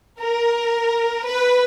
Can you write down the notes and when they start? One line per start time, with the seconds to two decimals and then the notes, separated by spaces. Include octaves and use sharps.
0.20 A#4
1.25 B4